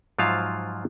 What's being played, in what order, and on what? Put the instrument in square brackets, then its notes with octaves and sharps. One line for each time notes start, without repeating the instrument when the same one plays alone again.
[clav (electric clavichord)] G#2 F3 F#3 F4 E5 F5